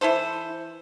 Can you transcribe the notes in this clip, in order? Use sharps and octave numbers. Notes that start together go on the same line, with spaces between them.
E3 E4 A4 C5